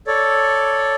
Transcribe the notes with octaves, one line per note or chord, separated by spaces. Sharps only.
A4 C#5 D5